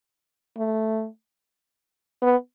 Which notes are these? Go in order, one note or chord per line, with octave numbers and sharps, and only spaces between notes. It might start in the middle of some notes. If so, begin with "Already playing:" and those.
A3
B3